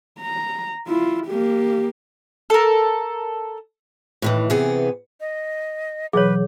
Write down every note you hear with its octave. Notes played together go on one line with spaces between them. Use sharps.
A#5
E4 F4
A#3 G4
A4 A#4
A2 D#3 E3
C3 E3 B3 G#4
D#5
B2 E3 F#3 G#4 B4 C#5